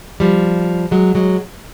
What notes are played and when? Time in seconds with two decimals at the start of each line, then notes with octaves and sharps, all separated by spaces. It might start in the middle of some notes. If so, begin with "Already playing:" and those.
0.20 F3 G3
0.91 F#3 G#3
1.15 F#3 G#3